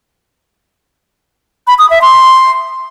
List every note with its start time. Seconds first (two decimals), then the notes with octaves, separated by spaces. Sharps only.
1.67 B5
1.79 D#6
1.90 E5
2.02 C6